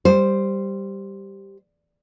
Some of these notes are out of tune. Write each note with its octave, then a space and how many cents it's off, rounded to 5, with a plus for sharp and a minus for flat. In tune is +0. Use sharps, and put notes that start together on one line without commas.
G3 +0 C5 +0